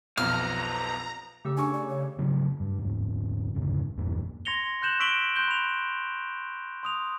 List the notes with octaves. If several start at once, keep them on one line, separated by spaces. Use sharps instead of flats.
B1 F2 F3 B3 A#5 F6
C#3 A3 G4 E6
D4 G#5 C#6
D5
C#5
C#3 F#3 A3
G2
D#1 G#2
F1 D2 G#2 C#3
A#1 E2 G2 A#3
C6 G#6 A#6 C#7 F7 G7
C6 F#6 G6 E7 F#7
C#6 E6 B6 D7 F#7 G7
C6 F#6 G6 G7
B5 F7
C6 D#6 F7